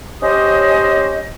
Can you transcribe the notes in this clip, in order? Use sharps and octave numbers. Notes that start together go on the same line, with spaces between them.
C#4 G4 C5 D#5